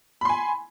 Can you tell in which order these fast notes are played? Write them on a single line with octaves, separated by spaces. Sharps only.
B5 C6 G#5